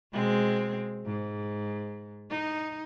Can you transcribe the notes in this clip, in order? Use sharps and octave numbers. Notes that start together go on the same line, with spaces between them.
B2 G#3 C4
G#2
D#4